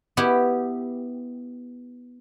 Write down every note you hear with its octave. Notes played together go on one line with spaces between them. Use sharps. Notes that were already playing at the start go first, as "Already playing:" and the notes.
B3 E4 G4